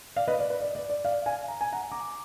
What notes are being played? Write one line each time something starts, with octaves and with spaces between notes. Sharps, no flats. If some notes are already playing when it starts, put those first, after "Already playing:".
D5 F5
B4 D#5
D5
B4
D5
D5
D5
D5 F5
F5 G#5
A#5
G#5
F#5 A#5
A#5 D6